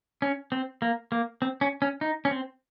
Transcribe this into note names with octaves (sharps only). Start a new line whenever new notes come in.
C#4
C4
A#3
A#3
C4
C#4
C#4
D#4
C#4
C4